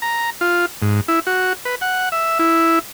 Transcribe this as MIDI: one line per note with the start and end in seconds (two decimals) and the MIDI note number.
0.02 0.30 82
0.41 0.66 65
0.82 1.01 44
1.08 1.20 64
1.27 1.53 66
1.65 1.75 71
1.81 2.09 78
2.12 2.38 76
2.39 2.79 64